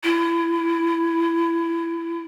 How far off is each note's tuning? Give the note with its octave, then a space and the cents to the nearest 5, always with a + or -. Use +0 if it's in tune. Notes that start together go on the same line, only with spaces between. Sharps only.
E4 +25